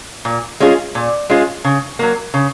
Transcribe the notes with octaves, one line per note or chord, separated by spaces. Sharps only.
A#2
G#3 C#4 F4 G#4
A#2
G#3 C#4 F4 G#4
C#3
F#3 A#3
C#3